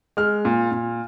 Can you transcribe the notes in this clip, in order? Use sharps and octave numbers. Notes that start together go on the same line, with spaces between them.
G#3 F6
A#2
A#2